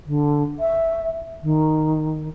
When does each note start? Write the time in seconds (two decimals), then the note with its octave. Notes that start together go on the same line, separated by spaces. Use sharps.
0.06 D3
0.59 E5
1.42 D#3